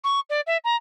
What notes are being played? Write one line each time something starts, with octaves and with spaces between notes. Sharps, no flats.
C#6
D5
E5
A#5